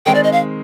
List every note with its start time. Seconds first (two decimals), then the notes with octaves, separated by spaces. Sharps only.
0.06 D#3 G#3 C4 G5
0.15 D5
0.24 D#5
0.32 F5